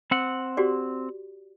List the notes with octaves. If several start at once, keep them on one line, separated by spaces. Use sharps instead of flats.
C4 F#5
F#4 G4 D5